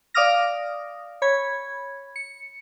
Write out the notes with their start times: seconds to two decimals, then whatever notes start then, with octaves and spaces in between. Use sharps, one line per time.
0.14 D5 F5 D6 D#6 F6 A#6
1.22 C#5 B5 G#6
2.16 C#7